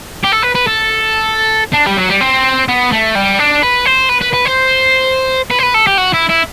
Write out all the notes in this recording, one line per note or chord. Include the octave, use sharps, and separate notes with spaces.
G4
A4
B4
B4
A4
D4
G3
F#3
G3
C4
B3
A3
G3
D4
B4
C5
B4
B4
B4
C5
B4
C5
B4
A4
G4
F#4
E4
E4